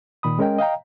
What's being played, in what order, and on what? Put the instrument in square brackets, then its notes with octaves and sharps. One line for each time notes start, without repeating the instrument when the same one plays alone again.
[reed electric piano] A#2 D#3 B5 D#6
G#3 C#4 A#4 D#5 G5
D#5 F5 G5 A#5